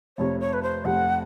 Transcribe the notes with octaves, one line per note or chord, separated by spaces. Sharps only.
F1 F2 C3 C#5
C#5
B4
C5
F1 F2 C3 F#5